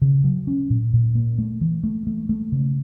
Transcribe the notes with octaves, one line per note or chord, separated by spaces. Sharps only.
C#3
F#3
C#4
A#2
A#2
A#3
A3
E3
A3
A3
A3
C#3